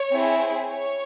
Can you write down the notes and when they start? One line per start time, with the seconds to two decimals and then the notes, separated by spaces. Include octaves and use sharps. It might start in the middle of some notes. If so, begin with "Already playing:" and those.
Already playing: C#5
0.11 C4 E4 G#4
0.71 C#5